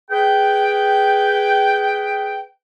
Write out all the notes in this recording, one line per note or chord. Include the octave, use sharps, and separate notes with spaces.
G#4 B4 G5